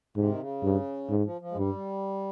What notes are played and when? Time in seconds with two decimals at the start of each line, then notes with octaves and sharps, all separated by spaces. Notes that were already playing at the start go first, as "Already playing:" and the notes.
0.16 G#2 C3
0.29 D#3
0.40 C#3
0.63 G2
1.10 G#2
1.25 F3
1.41 F3
1.52 G#3
1.57 G2 G3